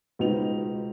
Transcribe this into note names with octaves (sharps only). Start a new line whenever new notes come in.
C#2 B2 D#4 B4 C5 F7